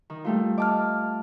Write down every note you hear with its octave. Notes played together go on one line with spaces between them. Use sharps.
D#3
G3 A3 F4
D#5 A5 D6 F6